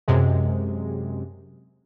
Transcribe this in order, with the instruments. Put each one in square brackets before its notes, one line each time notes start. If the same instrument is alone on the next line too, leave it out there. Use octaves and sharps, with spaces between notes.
[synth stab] F#2 C3 G#3